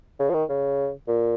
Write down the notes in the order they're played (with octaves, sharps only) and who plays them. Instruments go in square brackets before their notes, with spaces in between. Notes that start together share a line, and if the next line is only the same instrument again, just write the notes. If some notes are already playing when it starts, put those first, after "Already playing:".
[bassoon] C#3
F3
D#3
C#3
A#2